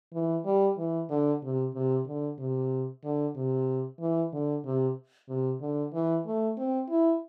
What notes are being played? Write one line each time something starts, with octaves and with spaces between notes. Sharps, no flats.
E3
G3
E3
D3
C3
C3
D3
C3
D3
C3
E3
D3
C3
C3
D3
E3
A3
C4
E4